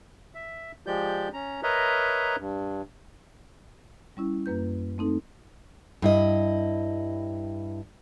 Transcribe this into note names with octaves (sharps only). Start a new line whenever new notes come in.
E5
F3 G#3 G4 D5 G6
C#4 A#5
A#4 B4 C#5 D#5 E5 A#5
G2
G3 C#4 E4
F#2 A#3 B4 G6
A3 C4 D#4 A4
G2 E4 D#5